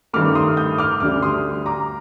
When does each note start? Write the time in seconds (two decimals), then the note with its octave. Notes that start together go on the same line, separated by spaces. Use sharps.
0.14 G2 D#3 A3 D6 F6
0.35 C6 D#6
0.57 D#6 G6
0.78 D6 F6
1.00 D2 D3 G3 D6 F6
1.22 C6 D#6
1.66 A#5 D6